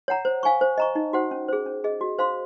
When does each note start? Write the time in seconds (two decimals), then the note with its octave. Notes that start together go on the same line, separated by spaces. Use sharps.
0.08 C#5 F#5 A#5
0.25 C5
0.43 F5 G#5 C#6
0.61 C5
0.78 D#5 A#5 C#6
0.95 D#4
1.13 F#4 C5 F#5
1.31 C#4
1.48 G#4 C5
1.66 C#4
1.84 G#4 D#5
2.01 F#4
2.18 C5 F5 C6